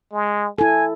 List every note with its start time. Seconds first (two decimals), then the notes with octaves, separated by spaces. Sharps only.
0.13 G#3
0.58 E4 A4 G#5